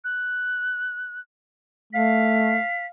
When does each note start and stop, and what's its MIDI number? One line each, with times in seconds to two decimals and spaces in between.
0.04 1.20 90
1.93 2.58 57
1.93 2.85 77
1.93 2.86 95